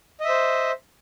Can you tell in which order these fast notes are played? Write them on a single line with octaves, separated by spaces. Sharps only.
D#5 E5 C5